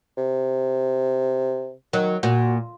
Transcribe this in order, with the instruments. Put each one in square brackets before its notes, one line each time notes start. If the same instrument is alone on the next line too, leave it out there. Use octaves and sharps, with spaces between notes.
[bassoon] C3
[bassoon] D#3 [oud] F#3
[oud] A#2 [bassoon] F#4